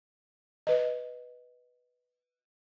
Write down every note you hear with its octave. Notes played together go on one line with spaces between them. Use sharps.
B4 D#5